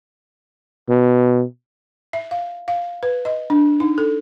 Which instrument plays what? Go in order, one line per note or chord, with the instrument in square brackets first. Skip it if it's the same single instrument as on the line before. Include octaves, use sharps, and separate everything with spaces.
[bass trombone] B2
[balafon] E5
F5
F5
B4
D#5
D4
D#4
A4